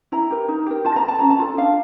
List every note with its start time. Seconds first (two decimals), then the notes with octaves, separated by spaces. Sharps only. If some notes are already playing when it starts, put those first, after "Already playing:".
0.12 E4 A#5
0.30 G4 A#4
0.49 D#4
0.67 G4 A#4
0.85 F4 A5
0.96 A#5
1.03 A4
1.08 A5
1.19 C#4 A#5
1.30 A5
1.39 F4 A4
1.57 D4 F5